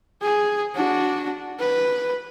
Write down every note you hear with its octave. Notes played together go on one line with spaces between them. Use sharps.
G#4
D4 F#4
B4